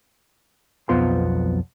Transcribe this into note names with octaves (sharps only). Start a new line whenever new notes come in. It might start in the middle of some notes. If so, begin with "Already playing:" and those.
B1 F2 B3 F4 C5 C6